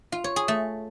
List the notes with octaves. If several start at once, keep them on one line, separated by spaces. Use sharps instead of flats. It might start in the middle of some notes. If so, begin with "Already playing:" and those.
F4
C#5
G#4
A3